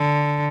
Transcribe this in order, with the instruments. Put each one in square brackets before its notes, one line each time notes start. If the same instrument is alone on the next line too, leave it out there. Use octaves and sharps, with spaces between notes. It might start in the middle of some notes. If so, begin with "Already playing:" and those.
Already playing: [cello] D3